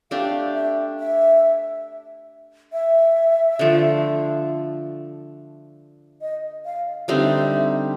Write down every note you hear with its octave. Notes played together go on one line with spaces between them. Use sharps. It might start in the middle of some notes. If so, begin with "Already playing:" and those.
A3 D4 G4 F5
E5
E5
E5
D3 F3 A3
D#5
F5
D3 G3 C4 D#4 E5